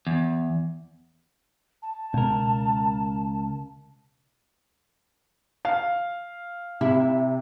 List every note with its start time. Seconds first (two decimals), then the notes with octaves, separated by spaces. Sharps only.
0.07 E2
1.82 A5
2.14 C#2 B2 A#4
5.65 F5
6.81 C3 E4